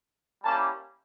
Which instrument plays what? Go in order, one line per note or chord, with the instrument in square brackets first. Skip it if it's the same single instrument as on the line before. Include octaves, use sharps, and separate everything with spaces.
[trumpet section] G3 A#3 C#4 E4 G4 A5